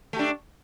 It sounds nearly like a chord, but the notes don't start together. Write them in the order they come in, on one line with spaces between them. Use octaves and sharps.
A3 G4 D4